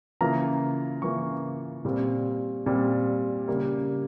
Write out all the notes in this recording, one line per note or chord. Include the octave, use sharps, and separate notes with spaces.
C#3 E3 A#3 F4 A#5
C#3 E3 A#3 F4 C#6
A#2 G3 C4
A#2 G3 C4
C#3 G3 A#3